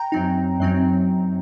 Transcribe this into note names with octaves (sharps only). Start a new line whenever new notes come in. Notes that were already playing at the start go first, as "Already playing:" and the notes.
Already playing: G5 A#5
F#2 F#3 C4 D#4
F#2 F#3 C4 D#4